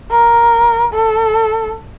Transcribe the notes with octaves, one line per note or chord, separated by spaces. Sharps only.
A#4
A4